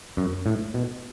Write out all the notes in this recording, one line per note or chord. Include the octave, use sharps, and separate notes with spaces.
F#2
A2
B2